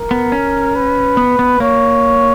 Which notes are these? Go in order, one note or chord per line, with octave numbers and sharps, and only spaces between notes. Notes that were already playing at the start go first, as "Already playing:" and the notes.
Already playing: A#4
B3
C#4
B4
B3
B3
A#3 C#5